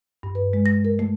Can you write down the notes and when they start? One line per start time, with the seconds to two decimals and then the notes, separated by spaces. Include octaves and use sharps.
0.23 G2
0.35 B4
0.53 G#3
0.66 A#6
0.85 A#4
0.99 A3